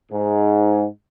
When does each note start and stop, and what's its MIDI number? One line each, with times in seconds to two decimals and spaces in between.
0.12 0.85 44